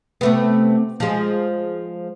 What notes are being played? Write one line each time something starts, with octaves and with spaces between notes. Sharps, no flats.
C3 A3 B3
F3 G#3